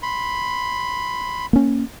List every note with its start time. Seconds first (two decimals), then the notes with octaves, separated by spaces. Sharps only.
0.03 B5 C6
1.53 A#3 C#4